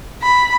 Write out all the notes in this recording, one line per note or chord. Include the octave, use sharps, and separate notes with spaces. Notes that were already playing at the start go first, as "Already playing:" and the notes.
B5